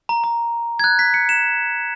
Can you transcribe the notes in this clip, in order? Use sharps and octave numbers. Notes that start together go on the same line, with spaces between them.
A#5
A#5
G#6
F#6
B6
C#7
E7